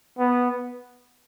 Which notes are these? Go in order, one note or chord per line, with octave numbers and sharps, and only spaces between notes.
B3